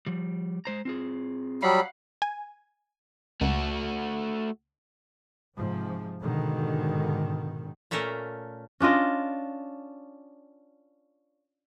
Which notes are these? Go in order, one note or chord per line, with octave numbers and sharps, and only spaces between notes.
F3 G3
G#3 C5 A#5
C4 F4 G#4
F#3 G3 F5 F#5 B5
G#5
C#2 A3 F#4
G#2 C3 F3
G#2 B2 D3 D#3
A#2 A3 C#4 A4 A#4
C#4 D4 F4 D#5